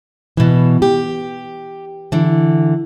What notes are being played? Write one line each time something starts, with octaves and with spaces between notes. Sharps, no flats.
B2 E3
G4
D3 E3